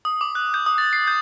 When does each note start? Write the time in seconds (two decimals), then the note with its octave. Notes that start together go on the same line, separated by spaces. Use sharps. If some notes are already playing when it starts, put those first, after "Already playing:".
0.05 D#6
0.21 D6
0.35 F#6
0.54 G6
0.66 D#6
0.78 A6
0.93 C7
1.07 G6